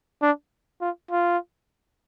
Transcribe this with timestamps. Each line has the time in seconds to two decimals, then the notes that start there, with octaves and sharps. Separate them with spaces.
0.22 D4
0.81 F4
1.11 F4